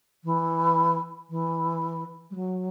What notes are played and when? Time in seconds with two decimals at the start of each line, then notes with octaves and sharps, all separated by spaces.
0.24 E3
1.30 E3
2.31 G3
2.36 F#3